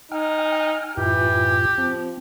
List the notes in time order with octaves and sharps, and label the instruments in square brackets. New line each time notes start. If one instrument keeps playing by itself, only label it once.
[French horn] D#4 [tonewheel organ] G5 G#5 F6
[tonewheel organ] F#2 A2 F4 [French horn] E3 [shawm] G4
[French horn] F3 [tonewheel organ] C4